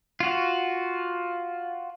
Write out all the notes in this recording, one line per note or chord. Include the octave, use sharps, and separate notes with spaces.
F4 F#4